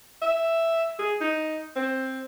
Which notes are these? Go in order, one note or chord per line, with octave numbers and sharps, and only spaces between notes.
E5
G#4
D#4
C4